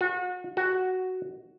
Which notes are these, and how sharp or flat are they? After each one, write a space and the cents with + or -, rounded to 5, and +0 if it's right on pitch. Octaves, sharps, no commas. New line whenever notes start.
F#4 -35
F#4 +5